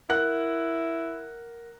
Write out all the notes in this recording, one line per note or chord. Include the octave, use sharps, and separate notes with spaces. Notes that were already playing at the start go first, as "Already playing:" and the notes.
E4 A#4 F#5 F#6